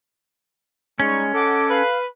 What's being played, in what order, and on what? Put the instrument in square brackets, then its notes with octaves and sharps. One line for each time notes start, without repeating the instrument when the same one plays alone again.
[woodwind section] G3 D#4 C#6 [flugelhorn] G#3 [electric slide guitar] C#4
[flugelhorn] A4 [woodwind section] D#5 F#5 D6
[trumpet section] B4 [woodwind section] F5